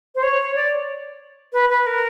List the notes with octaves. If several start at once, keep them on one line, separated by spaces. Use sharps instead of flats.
C5
C#5
D5
B4
B4
A#4